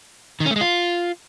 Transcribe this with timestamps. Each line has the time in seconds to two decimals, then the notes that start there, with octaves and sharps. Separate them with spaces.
0.40 D#3
0.46 C#4
0.51 A3
0.56 G#3
0.61 F4